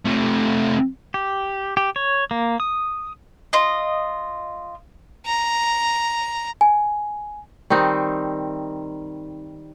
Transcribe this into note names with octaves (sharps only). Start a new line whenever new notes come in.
C3 A3
G4
G4
C#5
A#3
D#6
F4 D#5
A#5
G#5
D#3 G3 C4 D#4